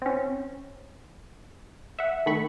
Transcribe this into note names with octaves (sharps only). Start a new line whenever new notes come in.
C4 C#4
E5 F#5
D#3 A3 B5 C#6